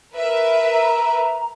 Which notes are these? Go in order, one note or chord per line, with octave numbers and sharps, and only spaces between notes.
A#4 B4 E5
A#5